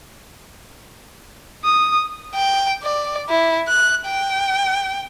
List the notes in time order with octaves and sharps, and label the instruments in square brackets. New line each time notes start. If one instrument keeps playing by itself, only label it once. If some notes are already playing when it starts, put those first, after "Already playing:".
[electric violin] D#6
[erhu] G5
D5
E4
F#6
G5